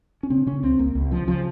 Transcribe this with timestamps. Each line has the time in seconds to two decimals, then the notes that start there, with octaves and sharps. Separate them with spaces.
0.23 C#4
0.30 C#3 C4
0.47 C#3 C#4
0.63 C#2 C4
0.79 C#2 A#3
0.95 C#2
1.11 C#3 F3
1.27 C#3 F3